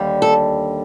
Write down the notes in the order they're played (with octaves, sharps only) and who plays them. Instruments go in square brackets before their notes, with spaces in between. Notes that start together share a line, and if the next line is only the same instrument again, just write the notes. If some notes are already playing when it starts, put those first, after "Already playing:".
Already playing: [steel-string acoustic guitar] D#2 D3 G3
A4